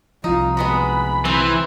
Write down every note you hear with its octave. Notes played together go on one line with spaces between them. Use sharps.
C2 F3 D#4 F4
G#3 B3 F#4 B5
E3 C4